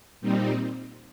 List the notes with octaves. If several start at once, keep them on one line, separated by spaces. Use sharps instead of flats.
A#2 G3 C4 D#4